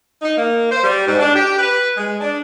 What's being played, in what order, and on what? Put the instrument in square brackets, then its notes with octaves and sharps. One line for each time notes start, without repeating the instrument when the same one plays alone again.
[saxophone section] D#4
A#3
C5
G3
G#2
D4
G4
B4
G#3
D4